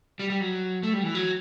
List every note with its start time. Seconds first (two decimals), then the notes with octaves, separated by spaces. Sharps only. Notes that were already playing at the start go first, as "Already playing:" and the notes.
0.19 G3
0.30 G3
0.40 F#3
0.83 A3
0.93 G3
1.03 E3
1.15 F#3